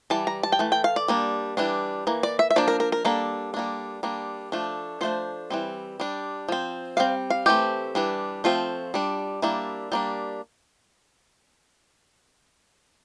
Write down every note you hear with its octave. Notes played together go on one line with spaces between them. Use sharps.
E3 G3 A5
A#5
A5
G5
E3 A3
G5
F5
D5
G3 A#3 D4
E3 G3 D4
E3 A#3
D5
E5
E5
F3 A#3 D4 D5
A#4
A#4
A#4
G3 A#3 D4 A4
G3 A#3 D4
G3 A#3 D4
F3 A3 D4
F3 A3 D4 C5
E3 G3 C4
G3 D4
F3 C4
G3 C4 F5
F5
E3 A3 C4 G4
E3 G3 D4
F3 A3 C4 F4
G3 D4
G3 A#3 D4 E4
G3 A#3 D4